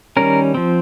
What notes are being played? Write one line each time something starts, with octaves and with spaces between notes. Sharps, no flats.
D#3 G3 C#4 A#4
F3 C4